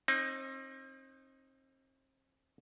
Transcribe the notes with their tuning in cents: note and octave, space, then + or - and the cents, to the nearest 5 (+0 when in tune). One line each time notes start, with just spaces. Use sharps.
C4 +35 D#4 +0